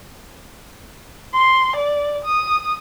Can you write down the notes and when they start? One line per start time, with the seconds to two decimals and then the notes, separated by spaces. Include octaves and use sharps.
1.33 C6
1.76 D5
2.25 D#6